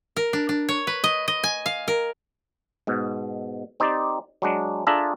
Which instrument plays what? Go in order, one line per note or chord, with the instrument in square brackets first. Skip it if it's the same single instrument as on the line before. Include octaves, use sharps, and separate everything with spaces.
[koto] A#4
D4
D4
C#5
B4
D#5
D#5
G#5
F5
A#4
[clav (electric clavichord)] G#2 B2
C4 D#4 G4 C5 D5
F#3 G#3 D4
D4 F4 G#4 A4 E5 A#5